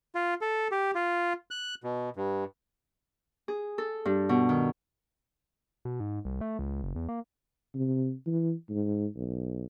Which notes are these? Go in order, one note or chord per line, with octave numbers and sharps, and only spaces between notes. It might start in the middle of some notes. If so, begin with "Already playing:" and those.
F4
A4
G4
F4
F#6
B2
G2
G#4
A4
G2
B2
D#3
B2
G#2
C2
A3
C#2
F#1
E2
A#3
C3
E3
G#2
B1